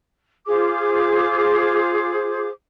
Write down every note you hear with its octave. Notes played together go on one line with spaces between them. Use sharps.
F4 G#4 C5 D6